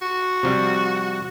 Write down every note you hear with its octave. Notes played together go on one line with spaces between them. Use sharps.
F#4
C3 F3 G3